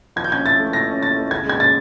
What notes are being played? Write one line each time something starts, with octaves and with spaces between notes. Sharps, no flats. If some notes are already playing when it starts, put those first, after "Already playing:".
F3 G#6
G6
C#4 G#6
E4 A6
A3
F3 A#6
C#4
E4 A6
A3
C#3 G#6
G#3 G#6
C#4 A6